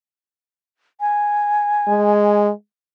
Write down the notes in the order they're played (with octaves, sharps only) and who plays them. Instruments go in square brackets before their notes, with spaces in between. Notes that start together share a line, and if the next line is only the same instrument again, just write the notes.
[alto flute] G#5
[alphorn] G#3